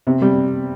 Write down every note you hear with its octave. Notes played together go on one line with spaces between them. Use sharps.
C3
G3